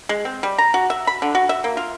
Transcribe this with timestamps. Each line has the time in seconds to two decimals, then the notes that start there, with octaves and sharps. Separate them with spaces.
0.09 G#3
0.25 C4
0.43 G3
0.58 A#5
0.74 F#4
0.90 E5
1.07 B5
1.22 D3
1.35 F#4
1.49 E5
1.64 A#3
1.77 F4